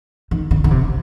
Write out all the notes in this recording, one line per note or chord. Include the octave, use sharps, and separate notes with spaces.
D#3
D3
D3
C3